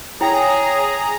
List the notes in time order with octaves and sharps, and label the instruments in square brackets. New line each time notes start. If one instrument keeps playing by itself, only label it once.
[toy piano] E4 G5 [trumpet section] G#4 [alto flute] C#5 [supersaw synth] A#5